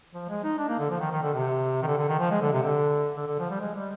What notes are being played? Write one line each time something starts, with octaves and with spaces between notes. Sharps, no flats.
F3
G#3
D#4
D4
A#3
D3
F3
D#3
D#3
D3
C3
D#3
D3
D3
D#3
F3
G#3
D3
C3
D3
D3
D3
F3
G3
G#3
G3